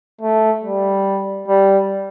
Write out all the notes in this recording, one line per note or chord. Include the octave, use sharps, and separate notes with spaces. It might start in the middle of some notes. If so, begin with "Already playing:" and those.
A3
G3
G3